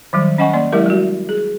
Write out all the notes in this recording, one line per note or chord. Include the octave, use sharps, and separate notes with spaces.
D#3 F#3 G3
C#4 D#5 F#5 G#5 C#6
A#3 D5 C6
F#3 G#3 E4 G4 A#4 E5
G3 F#4
G#4